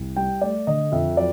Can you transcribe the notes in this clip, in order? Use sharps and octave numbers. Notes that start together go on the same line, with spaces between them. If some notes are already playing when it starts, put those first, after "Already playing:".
Already playing: C2
G3 G5
A3 D5
D3 D#5
F2 E5
F#3 D5